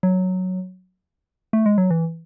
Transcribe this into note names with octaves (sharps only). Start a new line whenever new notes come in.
F#3
A3
G#3
F#3
E3